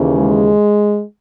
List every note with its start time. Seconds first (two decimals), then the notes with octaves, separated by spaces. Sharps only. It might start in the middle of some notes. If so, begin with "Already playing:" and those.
Already playing: D#2 C#3 E3
0.16 G#3